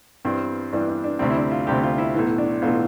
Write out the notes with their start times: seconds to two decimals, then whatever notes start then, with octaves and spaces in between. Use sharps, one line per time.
0.25 G2 E3 G3 C4
0.73 G2 E3 G3 D4
0.88 D4
1.04 D4
1.19 D2 C3 G3 C4
1.30 E4
1.36 D4
1.51 F4
1.67 D2 C3 G3 G4
1.83 F4
1.98 E4
2.15 B1 A2 E3
2.38 D4
2.62 B1 A2 E3 F4